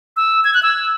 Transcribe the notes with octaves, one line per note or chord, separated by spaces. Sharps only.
E6
G#6
F#6
E6